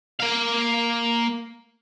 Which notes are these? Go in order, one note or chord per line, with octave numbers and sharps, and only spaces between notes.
A#3 F5